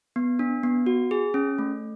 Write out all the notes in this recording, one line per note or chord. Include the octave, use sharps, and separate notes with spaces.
B3
D4
B3
F#4
G#4
C#4
A3